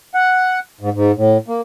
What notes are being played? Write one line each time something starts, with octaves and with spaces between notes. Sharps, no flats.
F#5
G#2
G#2
A2
A#3